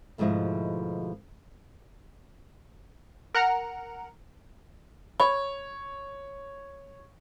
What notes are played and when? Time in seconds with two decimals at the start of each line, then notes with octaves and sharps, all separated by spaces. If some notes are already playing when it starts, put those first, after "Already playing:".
0.18 D2 G#2 B2 F3 E4 D#5
3.34 A#4 F#5 A#5 F6
5.20 C#5 B5